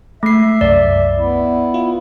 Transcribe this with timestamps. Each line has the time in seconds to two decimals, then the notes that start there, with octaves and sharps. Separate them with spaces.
0.23 G#3 A3 E5 C7
0.61 C2 F#2 D5
1.18 B3 E4
1.74 F4